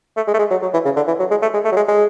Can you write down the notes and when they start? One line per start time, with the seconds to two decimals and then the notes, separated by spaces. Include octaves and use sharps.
0.16 A3
0.27 G#3
0.34 A3
0.39 G#3
0.51 F#3
0.62 F#3
0.73 E3
0.85 C#3
0.96 D3
1.07 E3
1.19 F#3
1.31 G#3
1.42 A3
1.54 G#3
1.65 A3
1.72 F#3
1.76 G#3
1.88 G#3